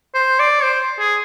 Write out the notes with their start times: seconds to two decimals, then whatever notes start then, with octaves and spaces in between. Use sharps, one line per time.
0.14 C5
0.39 D5
0.63 C5
0.99 G#4